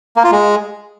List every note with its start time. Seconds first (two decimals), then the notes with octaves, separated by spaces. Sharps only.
0.16 A#3
0.24 F4
0.32 G#3